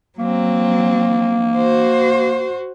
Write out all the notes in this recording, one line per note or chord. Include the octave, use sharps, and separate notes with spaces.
F#3 A#3 C4
F#4 C5